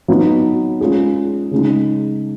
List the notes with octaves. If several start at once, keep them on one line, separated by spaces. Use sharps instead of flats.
F#3 B3 D#4
G#3 C#4 F4 G#4
C#3 G#3 D#4